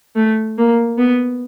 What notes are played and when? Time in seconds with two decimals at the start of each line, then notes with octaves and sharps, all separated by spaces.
0.16 A3
0.58 A#3
0.98 B3